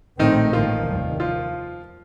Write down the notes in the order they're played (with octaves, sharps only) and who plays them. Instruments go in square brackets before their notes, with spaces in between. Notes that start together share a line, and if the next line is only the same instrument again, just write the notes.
[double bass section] A#1 A2 A3 C4 [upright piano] D#3 D#4
[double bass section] A1 G2 D#3 A#3 [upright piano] F3 F4
[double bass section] F1 D#2 D#3 G3
[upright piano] F3 F4